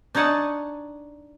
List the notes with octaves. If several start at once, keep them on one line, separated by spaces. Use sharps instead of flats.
D4 D#4 C#5 F#5 G#5 A5